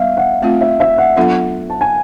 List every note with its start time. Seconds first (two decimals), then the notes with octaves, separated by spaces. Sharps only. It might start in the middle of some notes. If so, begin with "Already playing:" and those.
Already playing: G3 B3 E5 F5
0.17 F#5
0.42 A3 C4 F4 F5
0.61 E5
0.80 E5
0.98 F#5
1.16 F#3 B3 D4 F4 A4 F#5
1.70 A5
1.81 G#5